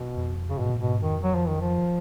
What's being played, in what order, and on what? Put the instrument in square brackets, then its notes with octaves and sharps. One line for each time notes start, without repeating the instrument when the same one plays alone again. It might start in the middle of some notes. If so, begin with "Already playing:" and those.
Already playing: [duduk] B2
[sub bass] F2
[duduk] C#3
[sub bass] G#2 [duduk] B2
[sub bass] A#2
[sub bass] G#2 [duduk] B2
[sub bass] F2 [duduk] D#3
[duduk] F#3
F3
D#3
F3